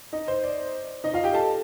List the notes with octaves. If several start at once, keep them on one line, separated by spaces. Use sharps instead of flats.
D#4 D#5
C5
D5
D#4 D#5
F4 F5
G4 G5
A4 A5